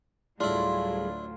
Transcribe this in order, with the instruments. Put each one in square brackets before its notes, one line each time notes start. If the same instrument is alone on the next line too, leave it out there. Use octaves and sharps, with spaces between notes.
[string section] D2 A2 F#3 [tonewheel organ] G3 G#4 [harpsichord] D4 E4 [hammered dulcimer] F4